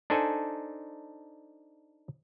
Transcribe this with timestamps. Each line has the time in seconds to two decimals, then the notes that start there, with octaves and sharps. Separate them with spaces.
0.10 D4 D#4 A4 C5 G#5